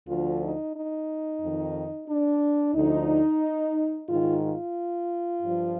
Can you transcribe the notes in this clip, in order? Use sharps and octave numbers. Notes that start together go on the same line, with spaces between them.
D2 D3 F3 F4
D#4
D#4
F2 D#3
D4
D2 D3 F3 D#4
G#2 D#3 F4
F4
G2 F3